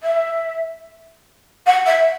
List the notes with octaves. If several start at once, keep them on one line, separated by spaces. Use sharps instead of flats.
E5
F#5
E5